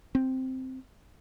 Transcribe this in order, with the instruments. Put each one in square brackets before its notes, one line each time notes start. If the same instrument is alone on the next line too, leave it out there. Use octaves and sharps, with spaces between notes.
[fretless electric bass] C4